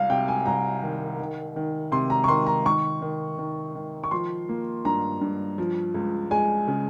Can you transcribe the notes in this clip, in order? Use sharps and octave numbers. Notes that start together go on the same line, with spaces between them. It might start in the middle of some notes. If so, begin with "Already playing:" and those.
Already playing: C2 F5
C3 G5
G#5
C2 A#5
D#3
D#3
D#3
C3 C6
A#5
C#6
D#3 C6
A#5
D#3 C#6
D#3
D#3
D#3
C#6
F3 C6
A#3
G2 A#5
G2
F3
C#2
G#3 G#5
C#3